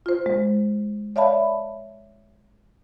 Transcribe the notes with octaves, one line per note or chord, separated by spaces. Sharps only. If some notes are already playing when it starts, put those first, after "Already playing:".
F4 C5
G#3
C#5 D5 E5 F5 A5 B5